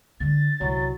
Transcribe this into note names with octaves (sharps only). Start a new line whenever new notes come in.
D3 A6
C2 F#3